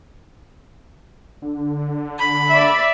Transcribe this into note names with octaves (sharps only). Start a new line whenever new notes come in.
D3
B5
D5 E5